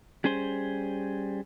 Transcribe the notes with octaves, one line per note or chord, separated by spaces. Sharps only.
G3 C#4 G#4 C5